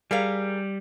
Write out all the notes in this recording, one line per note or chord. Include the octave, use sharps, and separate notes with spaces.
G3 G#4 A#4 F5